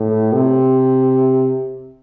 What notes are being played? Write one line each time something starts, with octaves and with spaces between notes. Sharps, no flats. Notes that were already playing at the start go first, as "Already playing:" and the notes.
Already playing: A2
C3